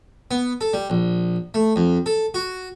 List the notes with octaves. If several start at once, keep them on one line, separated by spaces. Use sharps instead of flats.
B3
A4
G3
A#1
A3
F2
A4
F#4